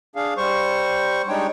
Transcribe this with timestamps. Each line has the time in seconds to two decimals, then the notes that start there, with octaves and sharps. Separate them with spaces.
0.16 D4 G#4 F5
0.37 G3 C5 C#6
1.29 G3 G#3 D4 D#4 C#5 G5